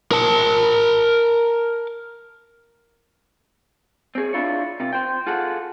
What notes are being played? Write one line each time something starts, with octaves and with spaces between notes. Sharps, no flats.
A#4 A5
C4 G#4
D4 E4 F4 C#5
C3 F4
C5 G5
F4 G#4 A4 F#5